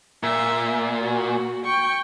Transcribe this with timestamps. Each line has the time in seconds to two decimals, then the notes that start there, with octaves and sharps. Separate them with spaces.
0.23 A#2 E5
1.00 F#4
1.65 G5 C#6